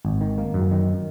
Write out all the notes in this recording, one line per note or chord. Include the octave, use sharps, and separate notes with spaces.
G#1
D#3
A#3
F#2
D#3